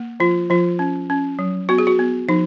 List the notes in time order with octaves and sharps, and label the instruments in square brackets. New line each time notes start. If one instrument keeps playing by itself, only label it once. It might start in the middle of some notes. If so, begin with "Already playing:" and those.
Already playing: [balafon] A#3
F3 F4
F3 F4
C#4
C#4
F#3
B3 F#4
G#4
F#4
B3
F3 D#4